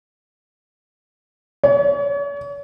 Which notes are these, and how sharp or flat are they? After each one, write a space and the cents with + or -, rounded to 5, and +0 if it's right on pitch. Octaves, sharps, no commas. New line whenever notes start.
C#5 +40